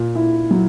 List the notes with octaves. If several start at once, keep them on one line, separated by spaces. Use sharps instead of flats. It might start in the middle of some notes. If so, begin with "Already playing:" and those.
Already playing: A#2
E4
F#3